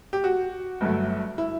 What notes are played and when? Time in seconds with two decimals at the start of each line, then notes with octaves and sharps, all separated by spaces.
0.13 G4
0.24 F#4
0.81 G1 G2 F#3 A3
1.38 E4